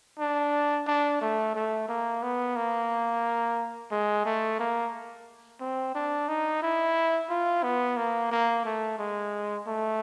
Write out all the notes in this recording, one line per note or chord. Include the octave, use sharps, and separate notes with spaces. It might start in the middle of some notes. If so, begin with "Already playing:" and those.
D4
D4
A3
A3
A#3
B3
A#3
G#3
A3
A#3
C4
D4
D#4
E4
F4
B3
A#3
A#3
A3
G#3
A3